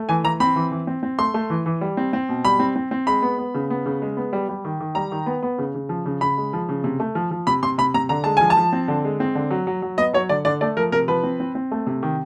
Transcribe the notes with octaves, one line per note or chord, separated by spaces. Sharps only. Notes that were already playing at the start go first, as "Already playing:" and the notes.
Already playing: A3
E3 G#5
E3 A#5
C4 B5
E3
E3
C4
C4
A3 C6
A3
E3
E3
G3
C4
C4
B2
G3 B5
C4
C4
C4
G#3 B5
B3
B3
C#3
B3
C#3
G#3
B3
G3
G3
D#3
D#3
G3 A#5
D#3
B3
B3
C#3
C#3
F3
C#3
C#3 B5
G#3
F3
C#3
C3
A3
F3
F3
C3 B5
C3 C6
C3 B5
C3 A#5
D3 A#5
G#3 A5
F3 G#5
A5
F3
C4
D3
G#3
C4
D3
F#3
F#3
F#3
B3 D#5
F#3 C#5
D3 D5
D3 D5
A3 D5
F3 A#4
C3 A#4
F3 B4
C4
C4
C4
A3
C3
D#3